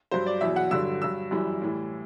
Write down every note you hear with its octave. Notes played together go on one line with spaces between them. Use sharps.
G2 F#3 C5
D5
E2 B2 F#3 E5
F#5
G2 D3 F#3 E6
G2 F#3 E6
F#2 E3 G3
A2 E3 G3